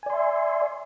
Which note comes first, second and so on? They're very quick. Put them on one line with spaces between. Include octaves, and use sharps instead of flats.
G#5 D5 C6 E5